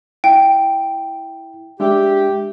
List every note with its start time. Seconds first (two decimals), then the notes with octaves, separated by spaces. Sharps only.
0.24 E4 G5
1.80 G#3 D4 G4 E5